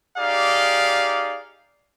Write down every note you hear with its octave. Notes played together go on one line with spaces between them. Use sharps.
D#4 G4 G#4 D5 F5